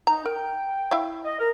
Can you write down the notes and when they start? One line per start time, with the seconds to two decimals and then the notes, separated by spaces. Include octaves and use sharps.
0.07 D#4 A#5
0.26 A#4 G5
0.91 E4 E5 F5
1.24 D#5
1.39 A#4